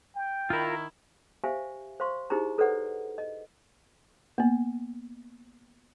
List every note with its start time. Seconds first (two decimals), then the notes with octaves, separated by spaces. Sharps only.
0.15 G5
0.50 D#3 E4 F4 A#4
1.44 G4 C5 E5 F5 G#5
2.00 C5 F5 C6 C#6
2.30 D#4 E4 G4 G#4 C5 A#5
2.58 A4 B4 C5 D5 F#5
3.18 D#5
4.38 A#3 B3